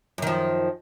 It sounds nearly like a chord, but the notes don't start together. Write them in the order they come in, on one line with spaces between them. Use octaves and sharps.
F#2 D#3 F3